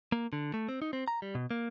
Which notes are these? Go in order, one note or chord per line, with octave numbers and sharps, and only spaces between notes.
A#3
D3
A3
C4
D#4
C4
A#5
G3
B2
A#3